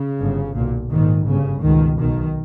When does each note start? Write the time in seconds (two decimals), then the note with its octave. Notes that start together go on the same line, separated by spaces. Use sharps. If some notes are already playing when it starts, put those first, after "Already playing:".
Already playing: C#3
0.19 G1 G2
0.55 B1 A#2
0.91 A#1 G#2 D#3
1.27 G1 G2 C#3
1.63 C#2 B2 D#3
2.00 B1 B2 D#3